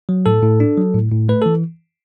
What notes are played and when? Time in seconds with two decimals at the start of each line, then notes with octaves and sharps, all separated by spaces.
0.09 F#3
0.26 A2 A4
0.42 A2
0.60 D4
0.77 F#3
0.94 A2
1.12 A2
1.29 A3 B4
1.42 E3 A4